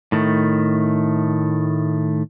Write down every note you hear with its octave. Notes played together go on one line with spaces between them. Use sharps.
A2 D#3 A3